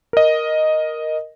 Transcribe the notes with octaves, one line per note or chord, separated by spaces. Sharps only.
A#4 D#5